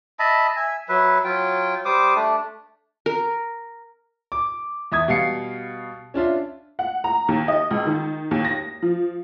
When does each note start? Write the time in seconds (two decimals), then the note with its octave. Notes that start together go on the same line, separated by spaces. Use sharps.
0.19 D#5 E5 A5 B5
0.56 E5 G#5
0.89 F#3 B4 E5
1.24 F#3 F4 G5
1.85 G3 C5 D6 D#6
2.15 A3 D4
3.06 A#4
4.32 D6
4.92 E2 E5 D#6 G#6
5.08 B2 G3 F5 C7 C#7
6.14 C#4 D4 F4 E5
6.79 F#5
7.04 A#5
7.28 D#2
7.48 D#5
7.71 C#2
7.87 D#3
8.31 D#2
8.45 A#6
8.82 F3